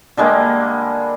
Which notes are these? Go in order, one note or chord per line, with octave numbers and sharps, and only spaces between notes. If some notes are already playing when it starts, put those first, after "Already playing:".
D3 G3 G#3 A#3